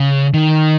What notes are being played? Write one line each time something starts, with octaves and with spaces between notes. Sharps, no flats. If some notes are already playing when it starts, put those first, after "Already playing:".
Already playing: C#3
D#3